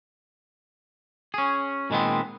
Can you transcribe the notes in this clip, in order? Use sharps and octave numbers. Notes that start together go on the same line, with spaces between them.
C#4 G#4
A#2 D#3 G#3 B3 C4